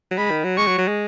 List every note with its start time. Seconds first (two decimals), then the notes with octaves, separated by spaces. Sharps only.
0.11 F#3
0.18 G#3 B5
0.31 D#3
0.44 F#3
0.57 G#3 C#6
0.67 F#3
0.78 F#3
0.88 G#3